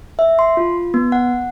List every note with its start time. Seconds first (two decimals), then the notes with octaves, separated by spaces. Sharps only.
0.19 E5
0.39 C6
0.57 F4
0.94 B3
1.12 F#5